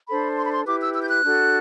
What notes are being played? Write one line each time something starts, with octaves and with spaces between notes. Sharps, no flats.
D4 A4 C5 B5
C6
B5
C6
E4 G4 B4 D6
E6
E6
G6
F#6
D4 F#4 A4